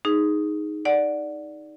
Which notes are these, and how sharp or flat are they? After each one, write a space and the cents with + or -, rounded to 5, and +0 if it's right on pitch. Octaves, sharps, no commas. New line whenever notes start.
D#4 +0 G#4 +0
D5 +0 F#5 -5